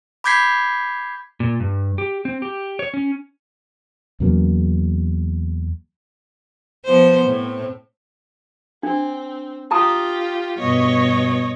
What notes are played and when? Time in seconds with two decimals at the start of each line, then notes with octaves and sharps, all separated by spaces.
0.24 B5 D6 G6 G#6 B6 C7
1.40 A#2
1.60 G2
1.98 G4
2.25 C4
2.42 G4
2.79 C#5
2.94 C#4
4.20 E2 C#3 F#3 A#3
6.85 F3 B3 C5
7.26 A2 C4
8.83 C4 D4
9.71 F4 G4 A5 A#5 D#6
10.59 G2 B2 C#5 D#5